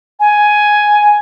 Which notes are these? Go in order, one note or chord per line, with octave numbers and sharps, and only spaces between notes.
G#5